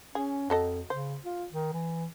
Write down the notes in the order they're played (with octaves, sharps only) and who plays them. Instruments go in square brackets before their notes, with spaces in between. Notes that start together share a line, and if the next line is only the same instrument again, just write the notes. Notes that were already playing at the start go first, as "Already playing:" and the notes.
[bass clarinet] C#4 [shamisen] G#4
[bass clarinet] F2 [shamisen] F#3 A4 D#5
[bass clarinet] C#3 [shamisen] C5
[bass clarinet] F4
D#3
E3